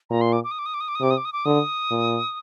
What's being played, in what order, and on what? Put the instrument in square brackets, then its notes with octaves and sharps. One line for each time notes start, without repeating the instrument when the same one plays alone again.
[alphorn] A#2 [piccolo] A#5
[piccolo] C6
D6
D6
D#6
D6
D#6
D6
D#6
D6
D#6
[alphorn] C3 [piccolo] D6
[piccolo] D#6
D6
D#6
D6
[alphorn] D3 [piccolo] D#6
[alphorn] A#2